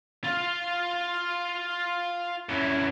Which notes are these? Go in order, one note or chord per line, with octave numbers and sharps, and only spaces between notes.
F4 F5
F#2 E3